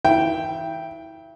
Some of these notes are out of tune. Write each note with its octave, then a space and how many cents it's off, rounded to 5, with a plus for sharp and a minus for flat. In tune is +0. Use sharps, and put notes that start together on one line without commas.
E3 -35 E5 +25 G5 +0